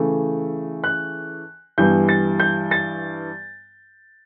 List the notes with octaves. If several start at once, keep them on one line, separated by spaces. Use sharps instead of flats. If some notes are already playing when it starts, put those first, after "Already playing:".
Already playing: C#3 E3 A3
F#6
G2 E3 G3 B3 G6
A6
G6
A6